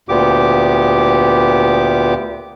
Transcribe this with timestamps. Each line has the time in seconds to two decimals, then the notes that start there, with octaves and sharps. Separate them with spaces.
0.09 D2 A#2 B3 G4 D6